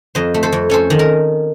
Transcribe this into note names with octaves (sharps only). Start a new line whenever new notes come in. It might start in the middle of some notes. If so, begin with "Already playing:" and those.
F2 C5 D#5
A3
A4 C5
F2
C#4 A4 C5
D#3
A#4